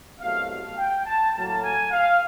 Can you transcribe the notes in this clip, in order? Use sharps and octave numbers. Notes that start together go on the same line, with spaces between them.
C2 B2 F#3 A3 F5
F5
G5
A5
A2 F#3 A#3 A5
G#5
F5